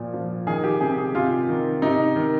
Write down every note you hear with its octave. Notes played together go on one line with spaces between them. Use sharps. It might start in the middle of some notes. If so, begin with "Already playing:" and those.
Already playing: A#2 F3
F3
D#3 G#4
G4
C3 G#4
G#4
C3 F4
D#3
C3 D#4
D#3